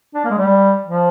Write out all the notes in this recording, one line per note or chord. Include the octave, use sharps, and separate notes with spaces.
D4
A#3
G#3
G3
F3